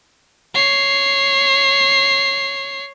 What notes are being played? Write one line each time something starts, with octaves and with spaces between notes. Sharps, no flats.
C#5 C7